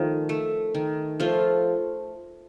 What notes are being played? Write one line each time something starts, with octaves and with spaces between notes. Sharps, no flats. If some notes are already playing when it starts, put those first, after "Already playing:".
Already playing: D#3 F3 A3
A3
D#3
F3 A3 F4